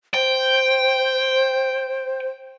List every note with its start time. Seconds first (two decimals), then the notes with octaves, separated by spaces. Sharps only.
0.14 C5 G5